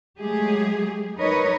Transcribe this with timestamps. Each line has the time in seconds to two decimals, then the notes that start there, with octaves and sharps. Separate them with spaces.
0.20 F#3 G#3 A3 G4 G#4
1.18 F#3 D#4 A#4 B4 C#5 D#5